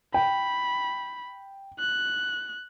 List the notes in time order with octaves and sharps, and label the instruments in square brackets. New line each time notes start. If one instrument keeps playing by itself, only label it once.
[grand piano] G5 [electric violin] B5
[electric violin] F#6